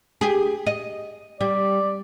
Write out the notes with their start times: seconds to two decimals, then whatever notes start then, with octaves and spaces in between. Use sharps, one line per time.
0.21 G4 G#4
0.67 D#5
1.41 G3 D5